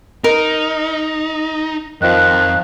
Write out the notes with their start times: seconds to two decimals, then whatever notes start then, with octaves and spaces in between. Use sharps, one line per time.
0.24 D#4 A#4
2.02 F2 D#3 F3 F#6